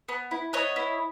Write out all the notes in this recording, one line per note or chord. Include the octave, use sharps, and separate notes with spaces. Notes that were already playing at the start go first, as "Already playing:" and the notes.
B3
E4
B3 C#5 D#5
E4